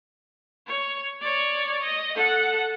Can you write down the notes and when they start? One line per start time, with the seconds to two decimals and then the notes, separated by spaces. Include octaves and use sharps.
0.67 C#5
1.21 C#5 D5
1.83 D#5
2.15 A4 F#5